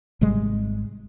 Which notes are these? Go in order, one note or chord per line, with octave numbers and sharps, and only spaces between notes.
G#1 C3 G3 G#3